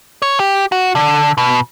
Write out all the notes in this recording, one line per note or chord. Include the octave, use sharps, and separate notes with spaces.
C#5
G4
F#4
D3
B2